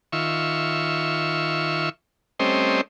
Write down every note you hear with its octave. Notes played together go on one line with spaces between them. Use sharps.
D#3 F4 E5 C#6
G3 A3 C4 C#4 C5 D#5